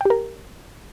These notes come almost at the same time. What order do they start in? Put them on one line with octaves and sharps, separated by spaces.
G5 G4 A#4